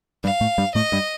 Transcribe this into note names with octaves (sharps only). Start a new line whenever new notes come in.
G2 G3 F5
A2 A3
G2 G3
A2 A3 D#5
G2 G3